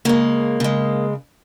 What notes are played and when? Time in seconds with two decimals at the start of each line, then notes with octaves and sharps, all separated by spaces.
0.05 C#3 G#3 A#3
0.60 C#3 G#3